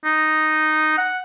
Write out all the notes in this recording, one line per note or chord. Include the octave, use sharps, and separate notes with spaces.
D#4
F#5